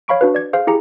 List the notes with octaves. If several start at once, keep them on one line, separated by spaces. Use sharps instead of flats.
C#5 F5 B5 C#6 D7
D4 F#4 B4
D5 G#6
G#4 C5 F5
E4 G4 G#4 A#5 C#7